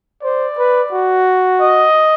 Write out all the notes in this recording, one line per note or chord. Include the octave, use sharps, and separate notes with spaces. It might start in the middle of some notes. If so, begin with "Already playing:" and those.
C5 D5
B4
F#4
D#5